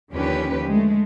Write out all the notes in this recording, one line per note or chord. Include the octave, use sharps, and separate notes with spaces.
D#2 D3 F3 C#4 G4 B4
G#3 A3